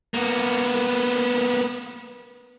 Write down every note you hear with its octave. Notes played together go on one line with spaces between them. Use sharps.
A#3 B3